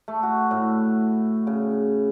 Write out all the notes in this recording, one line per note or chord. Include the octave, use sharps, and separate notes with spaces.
A3
F#4
A2
C#3